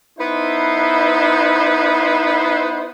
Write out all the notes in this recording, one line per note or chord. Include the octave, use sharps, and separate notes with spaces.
B3 D#4 E4 B4 C5